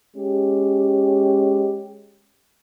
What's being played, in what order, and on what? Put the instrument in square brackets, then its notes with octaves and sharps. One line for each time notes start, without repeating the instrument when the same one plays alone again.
[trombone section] G#3 C#4 G4